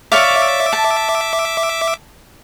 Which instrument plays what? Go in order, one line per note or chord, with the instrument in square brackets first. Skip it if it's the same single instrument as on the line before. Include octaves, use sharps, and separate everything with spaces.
[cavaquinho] C#5 D5 F5 [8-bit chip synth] E5 D6
[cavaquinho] A5